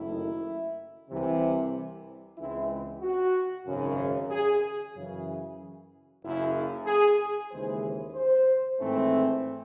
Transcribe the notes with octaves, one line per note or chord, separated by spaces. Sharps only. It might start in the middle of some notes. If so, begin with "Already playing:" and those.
Already playing: F#1 F#2 D#3 A3 E4
C2 C3 E3
C#2 C#3 E3 G#3 C4 E4
F#4
G#1 F#2 C#3
G#4
F#2 C#3 E3
F#1 F#2 C#3 E4
G#4
D#2 C#3 E3 G#3 C5
C5
G#1 G#2 E3 A3 C4